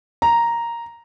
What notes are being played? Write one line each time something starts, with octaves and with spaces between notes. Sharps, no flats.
A#5